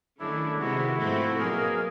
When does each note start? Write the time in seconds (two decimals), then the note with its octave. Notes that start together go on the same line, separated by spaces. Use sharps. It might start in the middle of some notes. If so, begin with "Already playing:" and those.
0.20 D#3 F#3 A3 C#4 D4 E4
0.60 C3 D#3 G#3 B3 E4 F#4
0.99 G#2 F3 A3 C4
1.38 B2 F#3 A#3 G#4 A#4